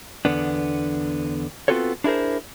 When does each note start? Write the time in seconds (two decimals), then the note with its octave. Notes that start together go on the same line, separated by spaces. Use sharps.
0.25 E2 D3 B3 D4
1.68 B3 C4 F4 F#4 A4 C#5
2.04 D4 E4 G#4 A#4 C5